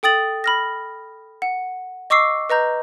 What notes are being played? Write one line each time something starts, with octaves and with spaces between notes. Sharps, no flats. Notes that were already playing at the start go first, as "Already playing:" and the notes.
A4 G5 D#6 A6 F#7
B5 F6 A#6
F#5
D#5 C#6 D6 E6 C7
B4 D#5 A#5 G6